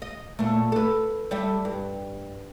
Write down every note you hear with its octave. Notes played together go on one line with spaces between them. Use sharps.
D#5
A#2 A3
A4 B4
G3 A4 E5
G2